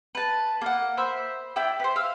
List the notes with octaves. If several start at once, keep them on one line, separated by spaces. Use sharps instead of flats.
B4 A5
A#3 F#5
C5 E5 B5
E4 D5 G5 E6
B4 C5
F5 E6